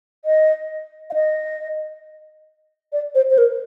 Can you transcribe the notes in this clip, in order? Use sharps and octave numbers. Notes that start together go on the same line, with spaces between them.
D#5
F5
D#5
D5
C5
C5
A#4